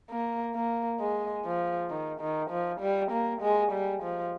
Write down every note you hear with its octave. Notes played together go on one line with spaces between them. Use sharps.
A#3
A#3
G#3
F3
D#3
D#3
F3
G3
A#3
G#3
G3
F3